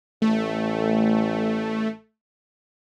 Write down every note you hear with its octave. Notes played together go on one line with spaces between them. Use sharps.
A1 A3